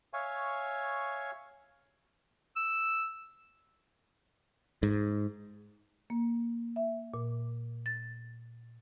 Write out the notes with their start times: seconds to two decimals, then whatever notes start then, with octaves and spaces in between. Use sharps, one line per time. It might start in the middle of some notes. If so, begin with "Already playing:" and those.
0.13 C#5 E5 F5 G#5 C#6
2.56 E6
4.83 G#2
6.10 A#3
6.76 E5
7.14 A#2
7.86 A6